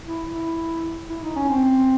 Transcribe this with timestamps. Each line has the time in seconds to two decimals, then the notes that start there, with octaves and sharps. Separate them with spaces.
0.06 E4
0.31 E4
1.09 E4
1.23 D#4
1.36 C#4
1.49 C4